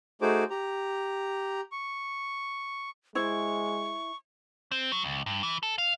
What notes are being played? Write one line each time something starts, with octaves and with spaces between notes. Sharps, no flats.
A3 D#4 F#4 G#4 C5 D6
G4 A#5
C#6
G#3 E4 C5 C#6
C4
F#3
C#2
G2
E3
A4
F5